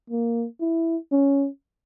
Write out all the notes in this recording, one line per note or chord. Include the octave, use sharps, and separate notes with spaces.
A#3
E4
C#4